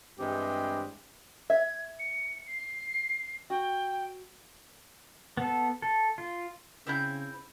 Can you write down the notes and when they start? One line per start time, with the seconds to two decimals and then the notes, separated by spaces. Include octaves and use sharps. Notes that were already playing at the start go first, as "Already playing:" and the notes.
0.19 G2 E3 G#3 C4 G4
1.50 E5 G#6
1.99 C#7
2.47 C7
3.50 F#4 G5
5.37 B3 A4
5.82 A4
6.18 F4
6.87 C#3 C4 E4 G6